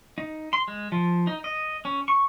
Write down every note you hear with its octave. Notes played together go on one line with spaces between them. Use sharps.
D#4
C6
G#3
F3
D#4
D#5
C#4
C#6